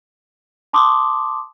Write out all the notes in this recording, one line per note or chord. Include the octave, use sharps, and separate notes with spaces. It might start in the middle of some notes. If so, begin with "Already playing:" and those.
A5 C6 D6 D#6